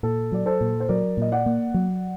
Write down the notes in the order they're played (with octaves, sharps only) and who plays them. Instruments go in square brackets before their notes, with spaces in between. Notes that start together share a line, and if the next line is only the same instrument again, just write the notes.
[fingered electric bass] A#2 [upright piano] A4
[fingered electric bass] F#3 [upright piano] D5
[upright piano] A4 C5
[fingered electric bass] A#2
[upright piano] C5
[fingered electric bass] F#3 [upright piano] A#4 D5
[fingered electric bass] A#2 [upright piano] D#5
[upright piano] D5 F#5
[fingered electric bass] A#3
F#3